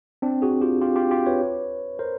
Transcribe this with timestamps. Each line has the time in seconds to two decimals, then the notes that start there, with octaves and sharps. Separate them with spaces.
0.22 C4 D4
0.42 F#4 G#4
0.61 F4 G4
0.81 F4 G4
0.96 F4 G4
1.11 F4 G4
1.26 B4 C#5
1.99 A#4 C5